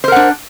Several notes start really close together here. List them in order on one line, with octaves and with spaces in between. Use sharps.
C5 A#4 F#5 D4